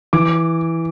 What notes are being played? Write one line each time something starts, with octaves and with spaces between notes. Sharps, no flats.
E3 D6